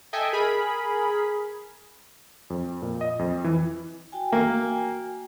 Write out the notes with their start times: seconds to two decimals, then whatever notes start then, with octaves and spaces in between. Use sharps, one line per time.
0.13 A4 D#5 E5 G5 G#5
0.33 G#4 A#4 B5
2.50 F2
2.82 A#2
3.01 D#5
3.19 F2
3.44 E3
4.12 F#4 G5 G#5
4.32 A#3